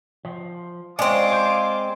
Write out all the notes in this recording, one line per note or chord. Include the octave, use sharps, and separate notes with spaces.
F3
G#3 C4 C#4 F4 D5 F5 C6 D6
C5